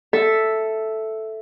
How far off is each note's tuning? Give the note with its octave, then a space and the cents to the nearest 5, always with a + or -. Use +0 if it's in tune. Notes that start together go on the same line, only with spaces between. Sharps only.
A4 +0 E5 +0